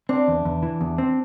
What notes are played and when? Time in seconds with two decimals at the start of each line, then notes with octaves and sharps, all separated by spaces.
0.09 C4 D4
0.28 E2
0.45 E2
0.63 E3
0.81 E2
0.98 C4